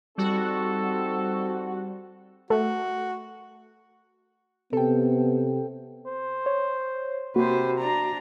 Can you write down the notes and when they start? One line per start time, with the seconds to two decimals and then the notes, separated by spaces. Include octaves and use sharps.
0.18 G3 C4 D#4 F#4 A4
2.50 A3 F#4
4.73 C3 B3 A4 G5
6.07 C5
6.46 C#5
7.36 C3 A#3 F#4 B4 C5
7.78 D4 A#5